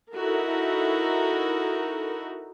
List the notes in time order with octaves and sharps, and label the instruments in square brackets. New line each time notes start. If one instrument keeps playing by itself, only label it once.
[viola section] D#4 E4 F#4 A4 A#4